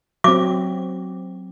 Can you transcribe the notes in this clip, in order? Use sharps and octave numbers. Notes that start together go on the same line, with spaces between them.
F#3 C4 D6